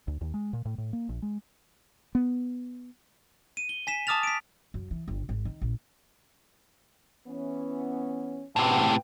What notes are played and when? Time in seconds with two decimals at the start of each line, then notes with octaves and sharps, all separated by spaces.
0.08 D2
0.21 D#2
0.34 G#3
0.53 A#2
0.65 A2
0.78 A2
0.93 A#3
1.09 A#1
1.22 G#3
2.15 B3
3.57 D#7
3.69 G7
3.87 G#5 B6 E7
4.07 A5 D6 D#6 F6 A6 F7
4.23 B6 D7
4.74 F#2
4.91 E3
5.08 G1
5.29 G#1
5.45 D#3
5.62 A#1
7.27 E3 B3 C#4
8.56 A2 C3 B4 F#5 G5